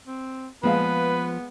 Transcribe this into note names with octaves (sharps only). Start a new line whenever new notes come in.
C4
A#2 F3 G#3 B3 B4 F5